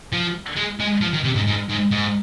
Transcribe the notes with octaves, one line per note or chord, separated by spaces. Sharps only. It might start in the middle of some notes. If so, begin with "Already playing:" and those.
F3
G#3
G#3
F3
D#3
C3
G#2
G#2
G#2
G#2